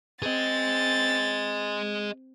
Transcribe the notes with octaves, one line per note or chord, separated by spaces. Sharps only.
C4 G#4 D#5 A6